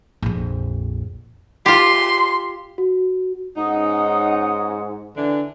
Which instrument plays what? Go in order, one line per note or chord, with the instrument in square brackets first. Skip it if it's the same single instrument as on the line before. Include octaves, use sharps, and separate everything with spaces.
[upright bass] A#1 F2
[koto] F4 G4 [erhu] C6
[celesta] F#4
[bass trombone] G#2 [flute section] C#4 F#5 D#6 [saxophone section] D#4
[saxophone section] D3 E3 D4